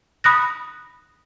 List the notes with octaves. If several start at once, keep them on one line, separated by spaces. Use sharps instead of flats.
B5 D#6 F#6 A#6